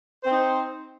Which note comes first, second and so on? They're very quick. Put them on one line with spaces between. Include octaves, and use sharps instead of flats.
C5 C4 D#4